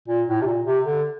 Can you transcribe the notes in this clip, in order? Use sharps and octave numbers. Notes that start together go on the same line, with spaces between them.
A#2
A2
C3
A#2
C3
D3